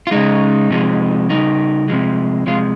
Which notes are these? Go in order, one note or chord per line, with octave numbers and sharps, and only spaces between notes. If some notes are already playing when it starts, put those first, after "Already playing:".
F4
C#3 G#3 D#4
C3 F3 G#3
C#3 G3 D#4
C3 F3 G#3
C3 F3 G#3 F4